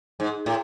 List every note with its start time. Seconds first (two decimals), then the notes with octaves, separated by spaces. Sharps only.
0.20 G#2
0.46 A2